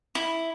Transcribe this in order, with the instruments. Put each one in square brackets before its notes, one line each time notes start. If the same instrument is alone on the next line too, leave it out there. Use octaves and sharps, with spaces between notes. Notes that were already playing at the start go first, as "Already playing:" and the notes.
[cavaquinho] E4